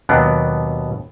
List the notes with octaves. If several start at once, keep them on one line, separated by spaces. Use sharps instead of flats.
D#2 B2 F#3 B3 D4